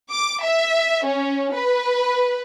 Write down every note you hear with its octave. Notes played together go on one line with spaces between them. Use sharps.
D6
E5
C#4
B4